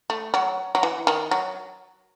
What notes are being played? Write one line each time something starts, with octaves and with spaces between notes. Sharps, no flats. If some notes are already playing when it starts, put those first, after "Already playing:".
A3
F#3
F#3
E3
D#3
F#3